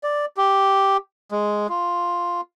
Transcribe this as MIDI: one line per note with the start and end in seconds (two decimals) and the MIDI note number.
0.03 0.25 74
0.37 0.97 67
1.32 1.67 56
1.69 2.41 65